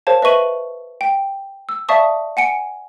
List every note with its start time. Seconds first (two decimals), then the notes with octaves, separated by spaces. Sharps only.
0.07 G#4 A#4 C5 C#5 F5 A5
0.22 B4 D#5 E5 C#6 D#7 F#7
1.01 G5
1.69 E6
1.89 D5 E5 F5 A5 C#6 D#6
2.37 F#5 G#5 C#7 D7